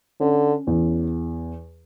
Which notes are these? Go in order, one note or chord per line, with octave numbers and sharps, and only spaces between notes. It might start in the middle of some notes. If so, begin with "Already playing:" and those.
D3 C#4
E2